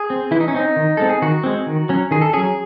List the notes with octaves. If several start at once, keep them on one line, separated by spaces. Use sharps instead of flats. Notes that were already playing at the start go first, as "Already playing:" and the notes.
Already playing: G#4
C4
E3 E4
D#4
C#4
C4 D#4
D#3
G#3 C4 A4
G#4
D#3 F#4
G#3 C4
D#3
F#3 C#4
D#3 G#4
A4
F#3 C#4 G#4